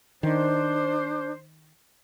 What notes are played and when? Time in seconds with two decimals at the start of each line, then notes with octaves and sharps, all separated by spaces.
0.23 D#3 D4 C5